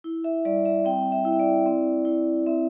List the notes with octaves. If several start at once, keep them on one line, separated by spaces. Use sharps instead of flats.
E4
E5
G3 D5
E5
C4 G5
E5
E4
E5
D5
C4
E4
C4 E5